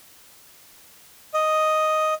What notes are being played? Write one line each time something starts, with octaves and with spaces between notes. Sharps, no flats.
D#5